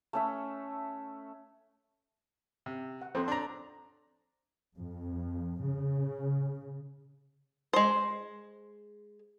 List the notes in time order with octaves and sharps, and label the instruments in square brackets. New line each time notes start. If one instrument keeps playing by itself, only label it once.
[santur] A3 C#4 E5
[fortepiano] C3
[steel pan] F#5
[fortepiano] F2 [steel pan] C4 A4 C5
[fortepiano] D4 A#5
[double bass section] F2
C#3
[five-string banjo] G#3 C5